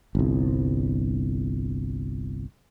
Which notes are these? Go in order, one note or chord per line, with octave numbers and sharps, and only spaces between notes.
G1 C2